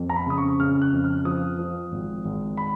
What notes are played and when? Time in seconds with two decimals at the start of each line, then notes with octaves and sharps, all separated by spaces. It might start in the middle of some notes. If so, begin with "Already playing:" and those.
Already playing: F2
0.09 A#5
0.16 B5
0.26 C#3 D#6
0.38 C#6
0.60 C#3 F6
0.82 F#6
0.93 F2
1.04 F6
1.25 F3 D#6
1.59 F3
1.92 G#1
2.25 G#1
2.57 B5